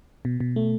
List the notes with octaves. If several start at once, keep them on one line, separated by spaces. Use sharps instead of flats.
B2
B2
A3